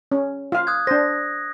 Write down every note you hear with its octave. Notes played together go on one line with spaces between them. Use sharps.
C#4
F4 F5
D#6 F#6 G#6
D4 C5 A#6